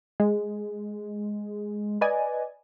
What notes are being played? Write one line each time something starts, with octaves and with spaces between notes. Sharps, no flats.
G#3
B4 D5 D#5 G#5